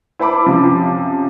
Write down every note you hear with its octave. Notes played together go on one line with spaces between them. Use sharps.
E4 C5 A5 B5 D6
F#2 C3 F3